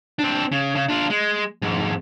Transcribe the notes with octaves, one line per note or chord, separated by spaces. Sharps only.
C4 D4
C#3
C#3
D4 F4
G#3
F2 G#2